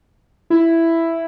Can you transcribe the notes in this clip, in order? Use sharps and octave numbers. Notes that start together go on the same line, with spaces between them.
E4